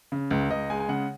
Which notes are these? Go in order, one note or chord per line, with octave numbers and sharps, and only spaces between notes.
C#3
C#2
C#2 D#5
G#3 G#5
G#5
C#3 F#5